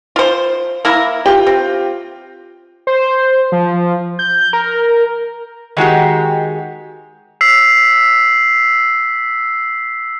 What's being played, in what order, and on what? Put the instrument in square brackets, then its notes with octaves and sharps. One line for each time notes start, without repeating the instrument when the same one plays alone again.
[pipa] F4 C5
A#3 E4 A#4
[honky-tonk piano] F4 G4 [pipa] G5
[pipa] C4
[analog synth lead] C5
F3
G6
A#4
[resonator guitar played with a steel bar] D#3 G#3 F#4 G4
[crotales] E6 B6 C7